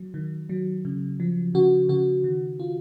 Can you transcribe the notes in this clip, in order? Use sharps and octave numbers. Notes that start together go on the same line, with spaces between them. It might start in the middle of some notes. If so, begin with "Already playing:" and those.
Already playing: F#3
D#3
F#3
C#3
F3
C#3 F#4
C#3 F#4
D#3
F4